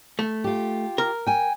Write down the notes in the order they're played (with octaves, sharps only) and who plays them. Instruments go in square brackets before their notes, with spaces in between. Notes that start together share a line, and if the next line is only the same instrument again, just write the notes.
[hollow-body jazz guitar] A3
[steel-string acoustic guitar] F4 G4
[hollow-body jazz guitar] A#4
[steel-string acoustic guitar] G5 G#5